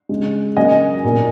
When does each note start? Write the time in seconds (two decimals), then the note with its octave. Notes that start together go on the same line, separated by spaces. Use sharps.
0.09 C#3 G#3
0.57 C#3 F#3 A#3 D#5 G#5
1.04 A#2 A#3